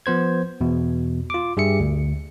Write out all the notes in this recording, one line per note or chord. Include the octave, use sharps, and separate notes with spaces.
F3 B3 C5 G#6
E2 B2
F4 D6
G2 G4 G#4 E5 C#7
D2